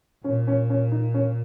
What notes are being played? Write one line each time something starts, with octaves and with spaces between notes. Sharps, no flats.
A#2 C#4
C#4
C#4
D#4
C#4